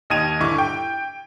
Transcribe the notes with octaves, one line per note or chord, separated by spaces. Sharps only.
D#2 D#5 D#6 G#6 D#7 F7
D#1 G2 D3 E4 C#6 D6
G5